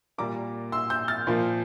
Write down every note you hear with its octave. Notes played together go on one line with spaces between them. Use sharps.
A#2 G3 A#3 A#5 D6
C6 E6
E6 G6
F6 A6
A#2 F3 A#3